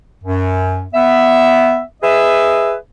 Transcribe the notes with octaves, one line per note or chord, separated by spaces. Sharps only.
F#2
B3 E5
G#4 B4 D#5 E5